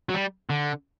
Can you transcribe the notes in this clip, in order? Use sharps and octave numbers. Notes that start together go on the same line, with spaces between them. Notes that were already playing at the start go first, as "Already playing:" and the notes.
F#3
G3
D3